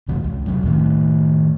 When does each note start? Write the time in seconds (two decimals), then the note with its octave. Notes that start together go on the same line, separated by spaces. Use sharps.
0.08 F2 C3 E3 F3
0.24 C#2
0.47 D#1 D#2 C3 F#3
0.65 A2 D#3 A3